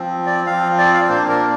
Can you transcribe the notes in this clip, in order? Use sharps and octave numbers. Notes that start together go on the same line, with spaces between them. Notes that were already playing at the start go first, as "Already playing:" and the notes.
Already playing: F3 C4
D5
F3 C4 F5
D5
F5
D5
A#2 A#3 D4 C5
A#4